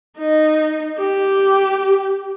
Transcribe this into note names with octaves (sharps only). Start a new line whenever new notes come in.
D#4
G4